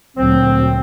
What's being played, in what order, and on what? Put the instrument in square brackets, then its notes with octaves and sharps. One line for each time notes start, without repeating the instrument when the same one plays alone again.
[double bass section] D2 A#2 F#3 [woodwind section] C4